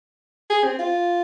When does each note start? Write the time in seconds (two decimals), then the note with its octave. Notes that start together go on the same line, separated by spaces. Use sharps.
0.50 G#4
0.64 C4
0.79 F4